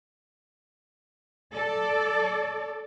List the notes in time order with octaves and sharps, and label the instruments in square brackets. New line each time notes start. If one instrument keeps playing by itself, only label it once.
[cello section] A4 D5